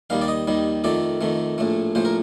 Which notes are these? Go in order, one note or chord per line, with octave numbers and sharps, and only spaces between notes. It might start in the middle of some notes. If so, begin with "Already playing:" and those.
D#2 D#3 G3 F5
D5
D#5
D#2 D#3 G3
F2 D#3 A3 D5
F2 D#3 A3
A#1 A2 A3
A#1 A2 A3 C5
A#4